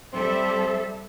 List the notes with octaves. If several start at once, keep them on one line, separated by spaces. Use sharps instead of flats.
G3 C4 A4 E5